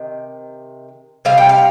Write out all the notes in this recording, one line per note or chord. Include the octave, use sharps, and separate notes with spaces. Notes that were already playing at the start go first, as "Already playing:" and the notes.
Already playing: C3 D#3
C3 G3 F5
G5
F5